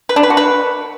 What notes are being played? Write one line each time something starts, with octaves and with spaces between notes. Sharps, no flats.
B4
D4
B4
F#4
B4